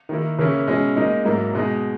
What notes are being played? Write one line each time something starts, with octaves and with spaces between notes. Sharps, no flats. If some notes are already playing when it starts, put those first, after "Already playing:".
D#3 A#3 E4
C#3 E3 A#3 C#4 E4
B2 G#3 C#4 E4
A#2 G#3 D#4
G#2 F#3 A#3 E4
B2 G#3 D#4